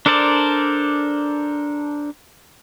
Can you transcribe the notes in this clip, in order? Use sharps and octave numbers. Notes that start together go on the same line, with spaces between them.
D4 A4 A#4 C5 D5